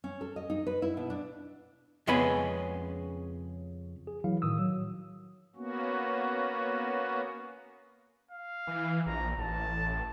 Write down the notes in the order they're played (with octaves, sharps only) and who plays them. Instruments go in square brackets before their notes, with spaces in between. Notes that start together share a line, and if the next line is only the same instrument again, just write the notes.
[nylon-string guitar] C#4
A4
D#5
D#4
B4
E4
B2
D4
[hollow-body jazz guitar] F2 C#3 G#3 B3 C#4 B5
[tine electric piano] G#4
E3 F#3 E4 F5
A2 D#3 D#6 E6
F#3
[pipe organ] A#3 B3 C#4 F#4
[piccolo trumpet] F5
[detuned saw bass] E3
[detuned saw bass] A#1 [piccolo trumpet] A#5
[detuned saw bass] A1 [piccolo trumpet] A5